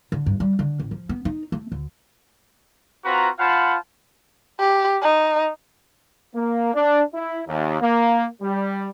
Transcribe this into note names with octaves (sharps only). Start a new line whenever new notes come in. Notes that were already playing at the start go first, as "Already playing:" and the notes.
D3
G2
G3
D3
A1
F3
B3
D#4
A3
D2
C4 F4 F#4 B4 A#5
F4 C5 F5 F#5 A5 B5
G4
D#4
A#3
D4
E4
D#2
A#3
G3